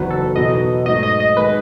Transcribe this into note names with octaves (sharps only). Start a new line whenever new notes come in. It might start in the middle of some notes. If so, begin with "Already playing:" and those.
Already playing: F#1 E2 D#3 F#3 B3 B4
A4
E2 B2 F#3 B3 D#4 D#5
G#2 F#3 A3 D#5
D#5
D#5
D#3 G#3 B4